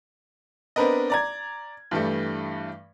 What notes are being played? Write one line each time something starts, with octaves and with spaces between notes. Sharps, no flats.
B3 C4 D4 A#4 B4 D#5
D5 A#5 G#6
G2 E3 G3 A3